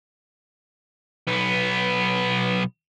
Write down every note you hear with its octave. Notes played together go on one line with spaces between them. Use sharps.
B1 B3